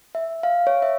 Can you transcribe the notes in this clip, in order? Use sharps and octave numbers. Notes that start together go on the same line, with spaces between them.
E5
F5
C#5
E5